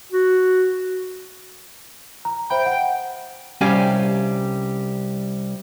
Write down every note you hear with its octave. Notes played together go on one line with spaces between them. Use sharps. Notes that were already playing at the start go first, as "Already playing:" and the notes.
F#4
A#5
C5 E5 G5 B5
F#5
C2 G3 C#4 G4 F5 G#5